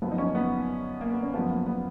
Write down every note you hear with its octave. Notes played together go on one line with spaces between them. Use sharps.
F#2 F3 B3
D#4
C#4
B3
A#3
B3
C#4
F#2 F3 B3
A#3
B3